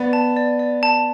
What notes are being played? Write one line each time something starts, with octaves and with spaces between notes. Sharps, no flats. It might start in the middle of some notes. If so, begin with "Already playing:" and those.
Already playing: B3 D5
A5
D5
D5
A5